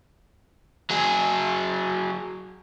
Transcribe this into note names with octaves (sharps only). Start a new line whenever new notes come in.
F#3 G#4